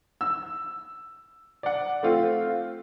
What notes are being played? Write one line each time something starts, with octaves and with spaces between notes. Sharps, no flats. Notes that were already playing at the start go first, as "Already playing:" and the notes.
E6
D5 F#5
A3 C4 F4